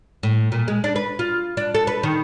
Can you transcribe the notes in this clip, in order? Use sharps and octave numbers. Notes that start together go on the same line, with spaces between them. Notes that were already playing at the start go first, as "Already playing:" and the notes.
A2
A#2
G#3
D4
B4
F4
D4
A4
B4
D#3